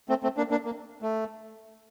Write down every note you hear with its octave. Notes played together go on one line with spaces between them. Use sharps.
A3 C4
A3 C4
A#3 D4
A#3 D4
A#3
A3